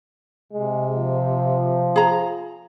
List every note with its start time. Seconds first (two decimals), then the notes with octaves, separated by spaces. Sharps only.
0.52 C3 G#3
0.96 F3
1.96 G#4 A#5